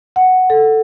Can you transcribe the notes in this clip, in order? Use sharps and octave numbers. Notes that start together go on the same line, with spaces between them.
F#5
A4